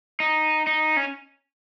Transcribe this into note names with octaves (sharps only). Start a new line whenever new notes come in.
D#4
D#4
C#4